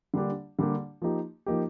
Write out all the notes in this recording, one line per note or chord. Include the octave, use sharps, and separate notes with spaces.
D3 G3 A#3 D4 G4
D3 G3 A#3 D4 G4
F3 A#3 D#4 G4
F3 A#3 D#4 G4